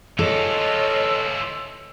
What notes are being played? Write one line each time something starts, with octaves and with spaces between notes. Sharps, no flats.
E3 F4 A4 C#5 D#5 E6